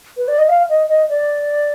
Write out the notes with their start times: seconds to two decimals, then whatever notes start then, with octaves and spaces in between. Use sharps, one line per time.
0.17 B4
0.28 D5
0.38 D#5
0.49 F5
0.69 D#5
0.89 D#5
1.10 D5